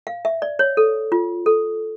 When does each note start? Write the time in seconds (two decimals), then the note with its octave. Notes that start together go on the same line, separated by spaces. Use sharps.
0.07 F5
0.25 E5
0.42 D5
0.59 C#5
0.77 A4
1.12 F4
1.46 A4